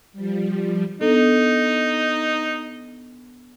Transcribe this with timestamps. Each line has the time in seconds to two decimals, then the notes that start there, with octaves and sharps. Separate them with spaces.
0.13 F3 G3
1.01 B3 D4 D#4 A4